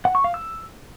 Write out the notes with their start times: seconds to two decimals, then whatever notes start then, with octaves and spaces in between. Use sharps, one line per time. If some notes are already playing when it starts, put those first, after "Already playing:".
0.05 F#5
0.15 C#6
0.24 F5
0.34 E6